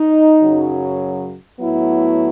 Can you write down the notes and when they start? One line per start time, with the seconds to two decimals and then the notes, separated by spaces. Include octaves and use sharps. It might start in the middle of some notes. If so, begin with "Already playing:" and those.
Already playing: D#4
0.41 F#2 C#3 F#3
1.59 A2 F#3 B3 E4